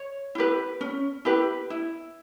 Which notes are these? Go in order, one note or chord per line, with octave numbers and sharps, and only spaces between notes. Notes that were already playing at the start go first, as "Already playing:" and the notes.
Already playing: C#5
E4 G4 B4
C#4
E4 G4 B4
E4